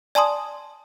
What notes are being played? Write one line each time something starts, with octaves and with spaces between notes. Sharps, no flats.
D5 G#5 A5 C6 D#6